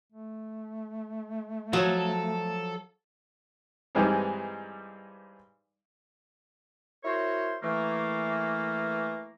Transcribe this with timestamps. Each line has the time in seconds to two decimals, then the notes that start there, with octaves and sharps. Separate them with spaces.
0.12 A3
1.73 F3 F#3 F#4 A4 C#5
3.95 G2 E3 G3 G#3 C4 D#4
7.04 E4 F#4 A#4 C5 C#5
7.62 E3 A3 A#3